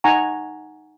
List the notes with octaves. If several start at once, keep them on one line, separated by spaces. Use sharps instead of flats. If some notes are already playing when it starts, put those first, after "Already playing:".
D#4 F#5 G#5 A#5 C#6